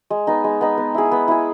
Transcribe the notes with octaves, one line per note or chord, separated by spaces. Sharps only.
G#3
B3 D#4
G#3
B3 D#4
B3
E4 G#4
B3
E4 G#4